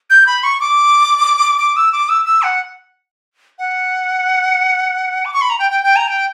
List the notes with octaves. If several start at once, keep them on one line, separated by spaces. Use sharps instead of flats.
G6
B5
C#6
D6
D6
E6
D6
E6
E6
F#5
F#5
D6
C#6
B5
A#5
G5
G5
G5
A#5
G5